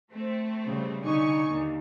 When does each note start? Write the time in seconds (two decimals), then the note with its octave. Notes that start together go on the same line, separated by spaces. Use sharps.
0.12 A3 C4
0.65 C#3 G3
1.02 C2 D3 D#4 G#5 C#6
1.49 D#2